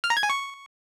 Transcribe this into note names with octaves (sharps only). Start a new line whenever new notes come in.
F6
A#5
G#6
G#5
C#6